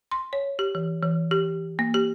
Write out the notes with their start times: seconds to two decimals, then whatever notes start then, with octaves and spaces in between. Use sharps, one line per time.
0.12 C6
0.33 C#5
0.59 G4
0.75 E3
1.03 E3
1.31 G4
1.79 A#3
1.94 G4